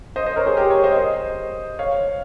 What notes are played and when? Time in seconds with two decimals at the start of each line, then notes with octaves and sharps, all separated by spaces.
0.16 C5 D#5
0.26 C5 D#5
0.36 A#4 C#5
0.46 G#4 C5
0.57 G4 A#4
0.70 A#4 C#5
0.84 C5 D#5
0.97 C5 D#5
1.79 C#5 F5